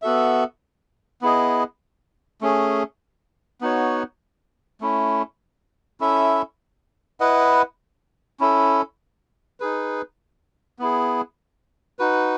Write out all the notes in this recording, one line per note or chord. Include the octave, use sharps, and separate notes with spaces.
B3 F#4 A4 E5
B3 E4 G#4 D#5
A3 C#4 G#4
B3 D#4 F#4 C#5
A3 C#4 E4
C#4 E4 A4 E5
E4 B4 D#5 F#5
C#4 E4 A4
D#4 G#4 B4
B3 E4 G#4
D#4 F#4 B4